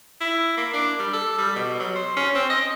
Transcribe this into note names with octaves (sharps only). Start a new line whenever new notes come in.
E4
A#3
D4
G3
A4
G3
B2
F#3
C5
C#4
C4
D#5